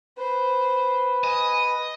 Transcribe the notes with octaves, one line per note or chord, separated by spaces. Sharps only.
B4 C5
D#5 G#5